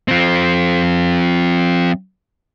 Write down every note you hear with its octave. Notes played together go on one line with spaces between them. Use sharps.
F3 C4